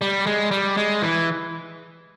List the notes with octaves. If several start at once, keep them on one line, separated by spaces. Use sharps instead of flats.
G3
G#3
G3
G#3
E3